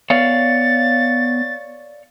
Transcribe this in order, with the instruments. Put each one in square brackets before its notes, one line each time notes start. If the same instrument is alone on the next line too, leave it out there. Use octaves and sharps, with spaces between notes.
[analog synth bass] B3 [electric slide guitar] C#5 D5 F5 [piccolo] A6